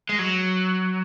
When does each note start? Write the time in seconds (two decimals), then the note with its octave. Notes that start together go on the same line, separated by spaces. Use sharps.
0.09 G#3
0.19 F#3